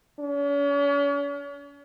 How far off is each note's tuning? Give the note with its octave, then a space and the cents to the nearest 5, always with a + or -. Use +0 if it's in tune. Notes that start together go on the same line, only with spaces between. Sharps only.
C#4 +40